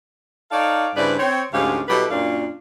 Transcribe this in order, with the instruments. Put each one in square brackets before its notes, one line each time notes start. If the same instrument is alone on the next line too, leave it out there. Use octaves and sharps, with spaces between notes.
[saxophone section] D#4 A4 C#5 D5 F5
G2 C#3 E4 B4 C5 D5
C4 C#5
D2 G#2 C#4 G4 G#4 F5
B2 F#3 E4 G4 A4 B4
F#2 A#2 C#4 D4 F4 F5